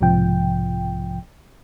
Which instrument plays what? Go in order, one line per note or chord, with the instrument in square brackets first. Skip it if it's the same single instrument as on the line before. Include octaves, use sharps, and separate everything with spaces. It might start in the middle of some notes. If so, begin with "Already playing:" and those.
[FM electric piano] B1 G#2 C3 F3 G5